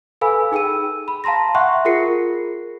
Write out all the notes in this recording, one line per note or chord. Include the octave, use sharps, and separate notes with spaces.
A4 B4 F5 G#5 B5 E6
D#4 G#4 G5 E6 D#7
B5
F5 A5 A#5 C6 A#6
E5 F#5 G5 C6 C#6 F#6
F4 G#4 A#4 A#6 C7 C#7